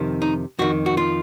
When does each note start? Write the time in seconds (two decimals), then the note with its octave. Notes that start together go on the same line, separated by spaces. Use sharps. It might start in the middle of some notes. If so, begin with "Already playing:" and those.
Already playing: F2 C3 D#3
0.22 D#4
0.59 F2 D#3 F#4
0.86 F#4
0.97 F4